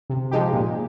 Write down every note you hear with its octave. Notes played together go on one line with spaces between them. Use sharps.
C3
F3 G#3 D#4 G4
A#2